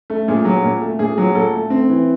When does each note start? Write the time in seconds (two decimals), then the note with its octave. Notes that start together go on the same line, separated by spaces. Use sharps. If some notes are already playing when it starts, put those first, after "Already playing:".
0.10 A3
0.28 A#2 G#4
0.45 F#3
0.63 A#2
0.81 A3
0.99 A#2 G#4
1.18 F#3
1.34 A#2 A4
1.53 A3
1.70 C4
1.89 E3